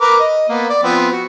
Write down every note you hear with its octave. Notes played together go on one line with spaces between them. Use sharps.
A#4 B4 D6
D#5
A#3 B3
D5
F3 B3 C4
F#4